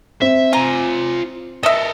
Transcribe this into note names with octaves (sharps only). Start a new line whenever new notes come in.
C4 E5
F4 G#5 A#5
A4 A#4 D#5 E5